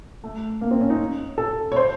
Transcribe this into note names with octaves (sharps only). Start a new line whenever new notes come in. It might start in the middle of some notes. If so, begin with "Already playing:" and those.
A3
A#3
C4
C#4
D#4
A4
C#5
C5